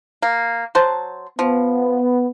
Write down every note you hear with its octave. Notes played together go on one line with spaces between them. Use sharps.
A#3
F#3 C5 A5
F3 B3